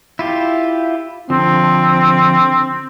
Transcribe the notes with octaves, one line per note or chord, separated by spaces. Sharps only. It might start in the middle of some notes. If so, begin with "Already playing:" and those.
E4 F4 G4
D3 F3 C4